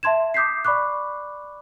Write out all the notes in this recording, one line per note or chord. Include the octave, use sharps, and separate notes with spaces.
E5 A5 C6 G#6 E7
D6 D#6 G6 B6 C7
D5 B5 C#6 D6 F#6